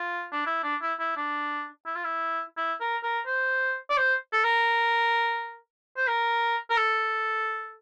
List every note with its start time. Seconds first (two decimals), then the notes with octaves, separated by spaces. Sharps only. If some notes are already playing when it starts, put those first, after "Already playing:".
Already playing: F4
0.33 D4
0.46 E4
0.63 D4
0.82 E4
1.00 E4
1.17 D4
1.86 E4
1.96 F4
2.05 E4
2.57 E4
2.81 A#4
3.03 A#4
3.26 C5
3.90 D5
3.98 C5
4.33 A4
4.44 A#4
5.97 C5
6.08 A#4
6.70 A#4
6.77 A4